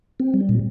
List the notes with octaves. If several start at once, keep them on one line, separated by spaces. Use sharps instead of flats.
C4
G3
A#2